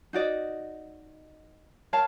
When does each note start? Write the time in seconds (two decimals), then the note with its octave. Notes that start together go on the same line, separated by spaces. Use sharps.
0.13 D#4 F#4 D5 D#5
1.93 A#4 C#5 F5 A5